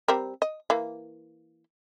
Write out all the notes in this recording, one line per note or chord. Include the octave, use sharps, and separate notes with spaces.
G3 C4 A#4
D#5
E3 A#3